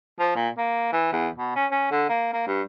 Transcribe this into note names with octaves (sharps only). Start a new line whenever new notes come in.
F3
A#2
A#3
E3
E2
B2
C#4
C#4
D3
A#3
A#3
G2